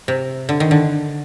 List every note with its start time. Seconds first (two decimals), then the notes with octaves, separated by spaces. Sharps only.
0.08 C3
0.49 D3
0.60 D#3
0.71 D3